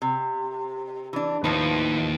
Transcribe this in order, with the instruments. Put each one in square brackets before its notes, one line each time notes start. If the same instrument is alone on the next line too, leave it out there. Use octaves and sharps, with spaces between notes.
[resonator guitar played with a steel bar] C3
E3 D4
[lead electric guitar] D#2 D#4 [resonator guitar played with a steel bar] A2 F3 B4